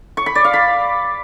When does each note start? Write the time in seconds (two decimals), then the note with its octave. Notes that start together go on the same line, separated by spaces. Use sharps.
0.17 C#6
0.26 B5
0.35 D5
0.44 F5
0.53 B5